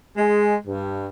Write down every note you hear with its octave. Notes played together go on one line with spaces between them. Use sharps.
G#3
G2